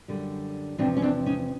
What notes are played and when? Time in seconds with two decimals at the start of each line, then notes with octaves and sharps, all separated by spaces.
0.08 F#2 D3 G3
0.78 E2 C3 F3 C4 D4
0.97 C#4
1.02 C4 D4
1.26 C#4 D#4